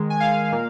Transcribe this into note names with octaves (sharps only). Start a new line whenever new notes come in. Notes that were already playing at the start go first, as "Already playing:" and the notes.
Already playing: D#3 G#3
G#5
F5
A#2 A#3